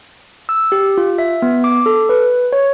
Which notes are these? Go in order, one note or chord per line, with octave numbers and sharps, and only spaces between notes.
E6
G4
F4
E5
B3
D6
A4
B4
C#5